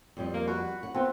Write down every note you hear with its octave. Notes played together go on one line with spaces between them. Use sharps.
F2 G3 D#5
A#3
F#4 B4
F#5
B3 C4 F4 B4